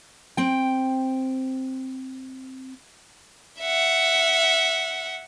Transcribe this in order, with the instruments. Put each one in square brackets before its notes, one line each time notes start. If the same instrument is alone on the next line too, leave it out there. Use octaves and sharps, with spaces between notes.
[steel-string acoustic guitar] C4 G5
[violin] E5 F#5